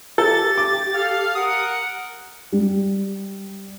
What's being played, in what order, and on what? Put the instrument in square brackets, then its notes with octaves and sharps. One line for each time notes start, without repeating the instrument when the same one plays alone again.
[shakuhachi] G4 [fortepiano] A4 [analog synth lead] A6
[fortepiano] D6
[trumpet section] A4 F5
[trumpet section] A#4 F#5 [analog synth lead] D#6
[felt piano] G3